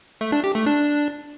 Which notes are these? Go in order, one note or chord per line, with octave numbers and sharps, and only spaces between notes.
A3
D4
G4
A3
D4